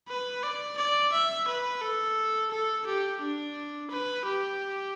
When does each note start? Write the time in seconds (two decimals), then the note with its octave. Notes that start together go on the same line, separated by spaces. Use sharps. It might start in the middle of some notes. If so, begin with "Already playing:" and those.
0.08 B4
0.43 D5
0.77 D5
1.13 E5
1.48 B4
1.81 A4
2.51 A4
2.86 G4
3.21 D4
3.90 B4
4.25 G4